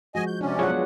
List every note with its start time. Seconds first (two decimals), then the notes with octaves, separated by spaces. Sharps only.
0.15 F3 G#3 F#4 D#5 G#5
0.27 G6
0.41 C3 C#4 D4 D5
0.59 F#3 F4 F#4 G#4 C#5 F#5
0.70 B3